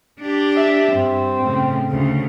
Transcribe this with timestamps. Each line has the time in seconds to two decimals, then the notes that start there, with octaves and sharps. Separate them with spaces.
0.21 D4 G4
0.56 E5
0.92 G2 C4
1.43 A2 C#3
1.91 D2 C#3